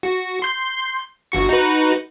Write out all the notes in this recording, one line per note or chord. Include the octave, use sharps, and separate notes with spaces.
F#4
C6 G6
G1 F#4 C#6
D#4 F#4 B4